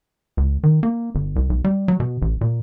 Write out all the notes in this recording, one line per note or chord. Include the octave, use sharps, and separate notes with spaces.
C#2
D#3
A#3
G1
C2
B1
G3
F#3
B2
A1
A#2